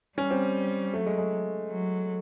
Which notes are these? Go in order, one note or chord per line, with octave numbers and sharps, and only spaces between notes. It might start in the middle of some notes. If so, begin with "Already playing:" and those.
G3 C#4
C4
F#3 A3
G#3
G#3
F#3